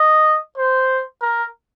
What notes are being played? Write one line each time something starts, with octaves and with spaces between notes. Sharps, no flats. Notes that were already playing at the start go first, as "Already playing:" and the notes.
Already playing: D#5
C5
A#4